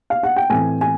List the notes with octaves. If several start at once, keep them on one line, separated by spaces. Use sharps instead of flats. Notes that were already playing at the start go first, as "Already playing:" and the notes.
F5
F#5
G5
A2 E3 A3 C4 G#5
G#5